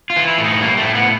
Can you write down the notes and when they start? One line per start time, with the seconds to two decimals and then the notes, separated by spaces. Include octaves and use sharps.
0.10 F4
0.16 E3
0.28 E4
0.38 A2
0.44 D#4
0.61 G3 A#3
0.77 A3
0.83 A2
0.95 B3